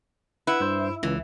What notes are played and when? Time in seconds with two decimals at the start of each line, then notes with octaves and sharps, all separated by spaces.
0.47 E4 B4 F#5
0.60 G2 C5
1.03 C#2 E3